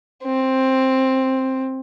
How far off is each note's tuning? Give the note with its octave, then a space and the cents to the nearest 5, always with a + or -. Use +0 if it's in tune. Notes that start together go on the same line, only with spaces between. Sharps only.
C4 +10